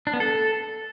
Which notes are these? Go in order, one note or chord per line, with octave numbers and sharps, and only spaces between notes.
D4
B3
A4